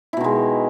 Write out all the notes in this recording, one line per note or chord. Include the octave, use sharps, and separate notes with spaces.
B2 D#3 G#3 E4